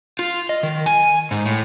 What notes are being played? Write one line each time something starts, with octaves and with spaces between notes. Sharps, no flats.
F4
D#5
D#3
G#5
G#2
A2